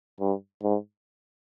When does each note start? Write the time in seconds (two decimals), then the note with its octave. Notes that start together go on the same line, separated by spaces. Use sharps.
0.20 G2
0.63 G#2